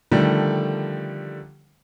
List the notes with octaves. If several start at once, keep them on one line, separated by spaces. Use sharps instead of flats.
D3 D#3 F3 G3 A3